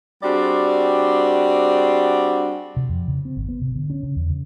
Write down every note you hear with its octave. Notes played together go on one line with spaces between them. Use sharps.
G3 C4 D4 F#4 G#4 D5
C3
F2
C#3
C4
G#1
B3
C3
D3
C#4
C#3
E2
C#3